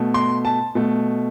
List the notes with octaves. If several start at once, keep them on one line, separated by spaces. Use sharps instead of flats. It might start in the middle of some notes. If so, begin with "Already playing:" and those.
Already playing: B2 A3
C6
A5
B2 A3